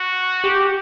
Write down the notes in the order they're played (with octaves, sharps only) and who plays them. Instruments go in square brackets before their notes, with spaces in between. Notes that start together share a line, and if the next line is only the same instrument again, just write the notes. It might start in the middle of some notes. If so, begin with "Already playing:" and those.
Already playing: [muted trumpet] F#4
[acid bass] G4